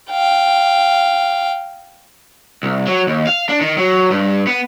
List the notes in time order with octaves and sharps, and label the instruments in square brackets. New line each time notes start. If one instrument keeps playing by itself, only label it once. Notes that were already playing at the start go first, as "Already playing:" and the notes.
[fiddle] F5 G5
[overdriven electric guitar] C2
F#3
D#2
F5
D4
D#3
F#3
G2
B3